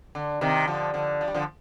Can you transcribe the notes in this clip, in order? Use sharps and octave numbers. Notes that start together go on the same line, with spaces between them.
D3
C3 D#3
D3 F3
D3 F3
F3
G3
D3 F3